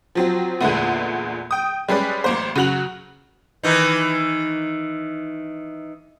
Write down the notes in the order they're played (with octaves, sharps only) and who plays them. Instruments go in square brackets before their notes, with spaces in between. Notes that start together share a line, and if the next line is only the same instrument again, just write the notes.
[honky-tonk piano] F3 F#3 C4
E2 A#2 D3 G#3 A3 B3
G5 D#6
G3 G#3 C#4 B4 D5
A1 A#3 C5
C#3 F#3 F#4 F7 F#7
[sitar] D#3 E3 D#4